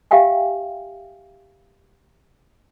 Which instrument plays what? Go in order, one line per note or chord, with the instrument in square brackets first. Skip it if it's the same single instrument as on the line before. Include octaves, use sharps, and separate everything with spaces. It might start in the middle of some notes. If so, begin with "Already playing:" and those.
[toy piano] G4 E5 F5 G5 G#5